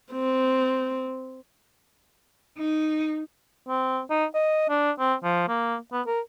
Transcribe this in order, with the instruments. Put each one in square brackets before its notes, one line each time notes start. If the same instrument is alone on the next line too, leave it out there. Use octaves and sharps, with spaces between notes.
[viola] C4
[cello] D#4
[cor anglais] C4
D#4
D#5
D4
C4
F3
A#3
B3
A#4